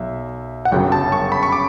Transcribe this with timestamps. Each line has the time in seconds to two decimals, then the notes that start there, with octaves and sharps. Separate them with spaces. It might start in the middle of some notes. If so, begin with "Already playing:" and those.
Already playing: B1 E5
0.65 F#5
0.72 G1 F#2 C#3 F#3 G5
0.92 A5
1.12 C#6
1.32 B5
1.43 C#6
1.52 D6